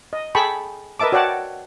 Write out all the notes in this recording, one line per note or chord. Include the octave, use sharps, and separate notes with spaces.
D#5
G#4 A4 G5 A5 B5 C#6
A#4 B4 D#5 E5 A5 D6
F#4 C#5 D5 F#5 G5 A5